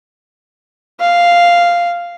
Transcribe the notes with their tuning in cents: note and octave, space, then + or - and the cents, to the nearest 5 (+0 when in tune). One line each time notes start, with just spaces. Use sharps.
F5 -5